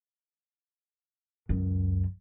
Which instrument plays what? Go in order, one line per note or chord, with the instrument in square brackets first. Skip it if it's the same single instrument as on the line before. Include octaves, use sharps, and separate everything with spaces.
[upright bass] C#2 F#2